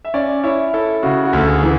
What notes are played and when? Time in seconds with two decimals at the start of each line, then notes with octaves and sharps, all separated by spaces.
0.05 E5
0.14 C#4 D5
0.44 E4 C#5
0.74 E4 A4
1.03 C#3 F#4
1.25 F#4
1.33 D2 A4
1.48 G#4
1.63 E3